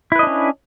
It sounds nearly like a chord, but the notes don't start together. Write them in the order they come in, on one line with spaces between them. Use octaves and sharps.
E4 B4 D#5 D4 C#4